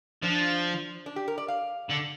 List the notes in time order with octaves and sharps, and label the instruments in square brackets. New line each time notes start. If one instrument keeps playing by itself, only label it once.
[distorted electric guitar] F3 [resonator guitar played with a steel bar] D4
[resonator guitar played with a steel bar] D4
G4
A#4
D5
F5
[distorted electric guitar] D3